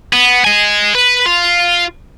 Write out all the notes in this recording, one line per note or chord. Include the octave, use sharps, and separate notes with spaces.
B3
D#5 G#5
B4
F4